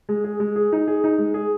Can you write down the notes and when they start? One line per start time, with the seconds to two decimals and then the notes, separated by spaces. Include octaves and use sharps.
0.09 G#3
0.24 G#4
0.40 G#3
0.56 G#4
0.72 D#4
0.88 G#4
1.04 D#4
1.18 G#3
1.34 G#4